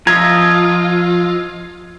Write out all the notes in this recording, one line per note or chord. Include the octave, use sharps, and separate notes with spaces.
F3 F4 D#5 E5 A#5 G#6